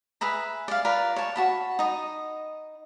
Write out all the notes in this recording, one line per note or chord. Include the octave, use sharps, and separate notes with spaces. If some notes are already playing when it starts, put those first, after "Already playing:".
G#4 B4 E5 A#5
D5 F5
F4 A#4 B4 D5
C#5 A5
F#4 A5 B5
D#4 D#5